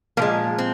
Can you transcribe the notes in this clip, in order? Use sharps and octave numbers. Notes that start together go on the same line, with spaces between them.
A#2 F3 G#3 A#3
C4